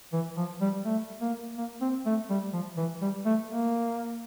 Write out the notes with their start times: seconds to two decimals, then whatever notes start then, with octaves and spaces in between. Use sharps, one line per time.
0.13 E3
0.37 F3
0.61 G3
0.85 A3
1.21 A#3
1.58 A#3
1.81 C4
2.06 A3
2.30 G3
2.53 F3
2.78 E3
3.02 G3
3.26 A3
3.50 A#3